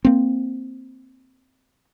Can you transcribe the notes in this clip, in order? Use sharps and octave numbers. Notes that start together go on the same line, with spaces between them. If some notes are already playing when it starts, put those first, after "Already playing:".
A#3 C4